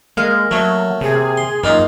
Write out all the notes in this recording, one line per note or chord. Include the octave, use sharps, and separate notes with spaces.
G#3 A#3 F5
F#3 A3 C#4
C3 G#4
C6
F#2 A#3 D#4 F4